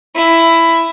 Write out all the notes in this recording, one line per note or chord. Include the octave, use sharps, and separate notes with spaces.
E4